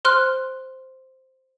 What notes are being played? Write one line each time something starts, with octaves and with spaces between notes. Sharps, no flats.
C5 C6 F6 F#6